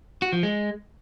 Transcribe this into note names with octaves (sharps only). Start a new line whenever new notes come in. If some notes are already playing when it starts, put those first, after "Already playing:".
F#4
F3
G#3